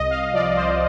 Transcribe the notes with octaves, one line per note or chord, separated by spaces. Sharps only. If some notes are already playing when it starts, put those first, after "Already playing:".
Already playing: C2 D#5
F5
F3 D5
C5